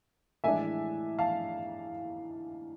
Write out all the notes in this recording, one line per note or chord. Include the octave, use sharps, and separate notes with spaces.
A2 E3 G#3 D4 E5 G#5
F5 A5